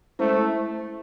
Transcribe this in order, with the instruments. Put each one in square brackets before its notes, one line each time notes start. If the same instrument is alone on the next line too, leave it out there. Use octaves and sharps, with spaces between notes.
[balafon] G#3 C#4 E4 C5 [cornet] A3